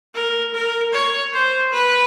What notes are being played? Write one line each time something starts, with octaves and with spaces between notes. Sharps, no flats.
A#4
A#4
C#5
C5
B4